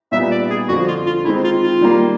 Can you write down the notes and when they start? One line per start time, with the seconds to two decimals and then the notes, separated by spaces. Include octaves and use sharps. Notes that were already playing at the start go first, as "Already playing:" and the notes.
0.12 A#2 G3 B3 D#4 E5
0.31 D5
0.50 G#4
0.68 F2 D3 F3 F#4
0.88 F4
1.06 F4
1.24 D#3 G#3 C4 D#4 E4
1.44 F4
1.63 F4
1.81 D#3 G3 A#3